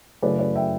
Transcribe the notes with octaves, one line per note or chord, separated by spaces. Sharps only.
F#2 C#3 E3 A3 B4 D5
B4 D5
E5 G5